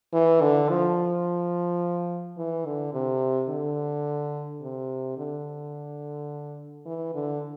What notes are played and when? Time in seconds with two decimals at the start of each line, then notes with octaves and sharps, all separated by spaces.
0.13 E3
0.42 D3
0.70 F3
2.38 E3
2.66 D3
2.94 C3
3.49 D3
4.62 C3
5.18 D3
6.86 E3
7.14 D3